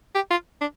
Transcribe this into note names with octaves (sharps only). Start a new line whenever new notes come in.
G4
F4
D4